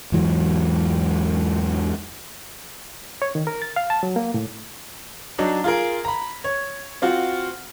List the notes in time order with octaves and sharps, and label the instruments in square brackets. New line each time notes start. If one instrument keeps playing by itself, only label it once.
[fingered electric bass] E2 G#2 E3 F#3
[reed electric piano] C#5
D#3
A#4
A6
F5
A5
F#3
A#3
A2
[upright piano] F#3 D4 D#4
F4 G#4 A#4
A#5 B5
C#5
C4 F4 F#4